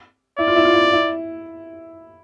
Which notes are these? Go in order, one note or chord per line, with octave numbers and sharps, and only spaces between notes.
E4 D5
F4
E4
F4
E4
E4